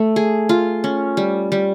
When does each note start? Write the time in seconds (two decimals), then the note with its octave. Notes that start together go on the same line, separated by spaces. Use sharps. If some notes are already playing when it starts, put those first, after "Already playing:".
Already playing: A3
0.16 G#4
0.49 F4
0.84 C#4
1.17 G3
1.52 G3